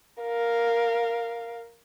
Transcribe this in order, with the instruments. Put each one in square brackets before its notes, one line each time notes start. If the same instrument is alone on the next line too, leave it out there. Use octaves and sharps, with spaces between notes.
[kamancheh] A#4 F5